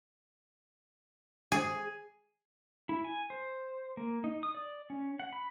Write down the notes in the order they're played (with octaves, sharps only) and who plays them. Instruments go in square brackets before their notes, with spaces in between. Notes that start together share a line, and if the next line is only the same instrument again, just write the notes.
[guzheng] G#4
[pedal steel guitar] E4
G#5
C5
A#3
D#4
D#6
D5
C#4
F#5
B5